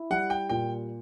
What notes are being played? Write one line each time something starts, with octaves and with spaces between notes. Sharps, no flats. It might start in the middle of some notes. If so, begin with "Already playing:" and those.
Already playing: E4
G3 F#5
G5
A#2 G5